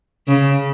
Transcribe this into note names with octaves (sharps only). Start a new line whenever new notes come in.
C#3